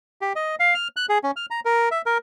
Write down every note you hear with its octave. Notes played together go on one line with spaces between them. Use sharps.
G4
D#5
F5
F6
F#6
G#4
C#4
F6
A#5
A#4
E5
A#4